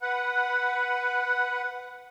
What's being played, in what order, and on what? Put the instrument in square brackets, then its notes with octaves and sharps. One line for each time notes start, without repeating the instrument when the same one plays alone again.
[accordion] B4 F#5